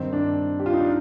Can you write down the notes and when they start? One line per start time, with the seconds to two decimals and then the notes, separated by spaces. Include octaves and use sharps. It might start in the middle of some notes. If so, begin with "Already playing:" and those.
Already playing: G2 D#3 C4
0.13 D4
0.59 G4
0.66 F4
0.74 D#4
0.80 D4